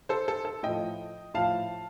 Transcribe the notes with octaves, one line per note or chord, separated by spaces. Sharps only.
A4 C5
A4
A4
A2 F3 D#5 G5
A2 F3 F5 A5